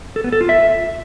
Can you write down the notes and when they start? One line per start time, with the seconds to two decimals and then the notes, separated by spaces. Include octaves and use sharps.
0.16 A4
0.24 B3
0.33 A4
0.41 F4
0.49 E5